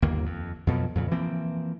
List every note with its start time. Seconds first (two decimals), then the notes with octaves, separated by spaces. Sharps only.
0.02 G1 D#2 A#3
0.26 F2
0.67 F2 B2 F3 F#3
0.95 F2 A#2 C#3
1.11 E3 F3 A#3 C4